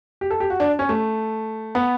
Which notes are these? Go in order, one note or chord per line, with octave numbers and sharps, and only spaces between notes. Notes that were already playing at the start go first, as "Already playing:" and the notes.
G4
A4
G4
F#4
D4
C#4
A3
B3